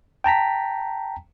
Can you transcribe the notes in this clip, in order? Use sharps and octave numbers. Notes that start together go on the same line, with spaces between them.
G5 A5 A#5 B6